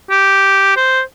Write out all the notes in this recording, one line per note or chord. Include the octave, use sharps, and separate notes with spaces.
G4
C5